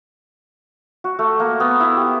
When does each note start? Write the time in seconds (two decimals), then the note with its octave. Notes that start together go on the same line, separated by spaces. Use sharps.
1.04 F#4
1.19 A3
1.40 A#3
1.60 B3
1.80 E4
1.97 G4